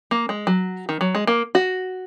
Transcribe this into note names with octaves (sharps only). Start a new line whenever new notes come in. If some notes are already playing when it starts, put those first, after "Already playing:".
A#3
G#3
F#3
D#3
F#3
G#3
A#3
F#4